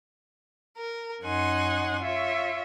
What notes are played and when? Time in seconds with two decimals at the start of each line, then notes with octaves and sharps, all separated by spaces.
0.77 A#4
1.23 F#2 D#4 C#5 F#5 G#5 C6
2.00 F4 C#5 E5